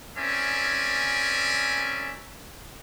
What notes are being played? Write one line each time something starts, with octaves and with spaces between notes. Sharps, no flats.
C4 C#4 A#4 D5 E5 G#5